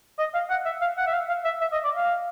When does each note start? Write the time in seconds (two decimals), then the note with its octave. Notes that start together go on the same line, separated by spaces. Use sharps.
0.18 D#5
0.34 F5
0.50 F#5
0.66 E5
0.81 F5
0.97 F#5
1.07 E5
1.13 F5
1.29 F5
1.45 E5
1.61 E5
1.72 D#5
1.84 D5
1.96 F5